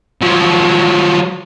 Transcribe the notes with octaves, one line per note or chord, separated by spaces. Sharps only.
F3 F#3